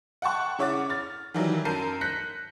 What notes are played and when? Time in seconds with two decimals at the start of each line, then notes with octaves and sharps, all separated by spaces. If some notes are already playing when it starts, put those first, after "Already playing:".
0.22 F#5 G5 A5 C#6 F#6
0.59 C#3 E4 C#5 F#5 D6 A6
0.89 F6 A6
1.34 D#3 E3 F#3 G3
1.65 F#2 A#4 A5 G6 C7 D#7
2.01 F#6 G6 A#6 B6 C#7